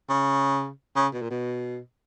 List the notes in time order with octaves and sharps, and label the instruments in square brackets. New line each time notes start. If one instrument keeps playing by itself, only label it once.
[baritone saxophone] C#3
C#3
B2
A#2
B2